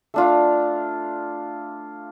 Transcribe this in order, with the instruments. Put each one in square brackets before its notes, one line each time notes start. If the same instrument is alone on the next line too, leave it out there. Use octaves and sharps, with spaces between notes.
[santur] A3 D4 F4